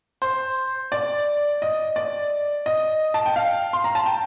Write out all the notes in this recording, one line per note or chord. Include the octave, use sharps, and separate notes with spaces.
C5
D5
D#5
D5
D#5
A5
G5
F5
C6
A#5
A5
G5